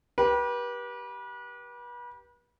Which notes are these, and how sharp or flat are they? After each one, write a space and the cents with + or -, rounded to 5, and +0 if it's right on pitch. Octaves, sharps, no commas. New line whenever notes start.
G4 -10 B4 -35